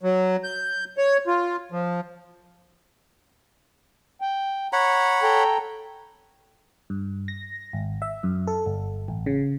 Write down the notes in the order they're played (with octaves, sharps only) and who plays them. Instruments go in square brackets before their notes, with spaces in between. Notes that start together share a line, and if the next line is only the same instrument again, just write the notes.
[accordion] F#3
G6
C#5
F4
F3
[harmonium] G5
[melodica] C#5 F#5 B5 [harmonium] A#5
[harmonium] A4 G5 A#5
[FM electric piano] G2
A#6
G#1
E5
F#2
A4
G1
A1
C#3